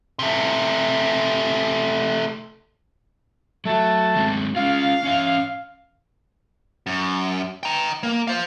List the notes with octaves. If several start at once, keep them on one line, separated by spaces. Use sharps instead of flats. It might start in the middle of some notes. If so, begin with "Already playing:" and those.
C3 A3
F#3 A3 F#4 A5
F#3 G#3 C4
C#4 F4 F5
C#4 C#5 E5
F#2
G5 A#5
A#3
C5 F5